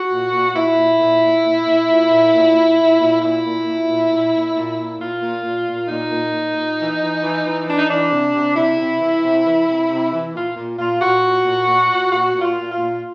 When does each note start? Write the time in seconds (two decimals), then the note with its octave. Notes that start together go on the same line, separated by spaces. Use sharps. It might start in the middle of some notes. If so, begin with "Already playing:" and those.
Already playing: F#4
0.10 A#2
0.33 A#2
0.54 A#2 E4
0.77 A#2
0.99 A#2
1.21 A#2
1.44 A#2
1.66 A#2
1.88 A#2
2.10 A#2
2.33 A#2
2.55 A#2
2.77 A#2
2.99 A#2
3.21 A#2 E4
3.44 A#2
3.66 A#2
3.89 A#2
4.10 A#2
4.33 A#2
4.55 A#2
4.77 A#2
4.99 A#2 F4
5.22 A#2
5.44 A#2
5.67 A#2
5.88 A#2 D#4
6.11 A#2
6.33 A#2
6.55 A#2
6.78 E3
7.00 E3
7.22 E3
7.45 E3
7.67 E3 D4
7.77 D#4
7.88 E3 D4
8.11 C3
8.34 C3
8.55 C3 E4
8.77 C3
9.00 E3
9.22 C3
9.45 E3
9.67 C3
9.89 C3
10.11 E3
10.34 A#2 F4
10.56 A#2
10.78 A#2 F4
11.00 A#2 F#4
11.22 A#2
11.44 A#2
11.67 A#2
11.89 A#2
12.12 A#2 F#4
12.34 A#2
12.42 F4
12.56 A#2
12.70 F4
12.78 A#2